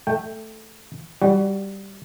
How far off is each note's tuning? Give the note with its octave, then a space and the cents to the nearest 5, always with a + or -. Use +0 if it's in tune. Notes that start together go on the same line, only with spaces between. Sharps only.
A3 +0 G5 +0
G3 +0 F#4 +20